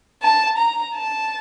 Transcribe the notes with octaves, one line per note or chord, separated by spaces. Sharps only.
A5
A#5
A5